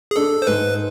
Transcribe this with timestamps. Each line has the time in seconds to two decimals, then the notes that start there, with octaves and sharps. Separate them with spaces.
0.11 G#4
0.16 D4 A4
0.42 C5
0.47 G#2 B4